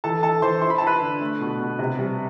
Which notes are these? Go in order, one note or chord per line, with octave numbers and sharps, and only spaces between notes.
E3 A4 A5
E3 A4 A5
E3 C5 C6
E4 C6
B5
A5
E4
B4 B5
D3
A3
B2
B2
C3
G3